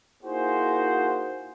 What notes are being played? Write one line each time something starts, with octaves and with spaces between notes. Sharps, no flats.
A#3 D#4 E4 F#4 G#4 C5